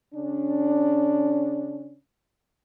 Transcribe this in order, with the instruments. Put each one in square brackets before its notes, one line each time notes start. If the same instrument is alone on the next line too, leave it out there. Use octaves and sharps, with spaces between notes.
[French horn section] C#3 C#4 D4